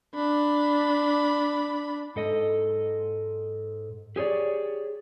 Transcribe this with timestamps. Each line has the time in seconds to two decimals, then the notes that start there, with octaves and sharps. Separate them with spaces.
0.15 D4 B5
2.16 G#2 A4 D#5
4.16 G4 G#4 C#5 D5